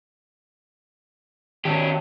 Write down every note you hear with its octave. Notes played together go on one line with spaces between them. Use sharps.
D#3 C#4 F#4 G4